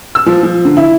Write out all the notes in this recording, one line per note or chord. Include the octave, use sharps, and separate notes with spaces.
E6
F3
F3
D3
E4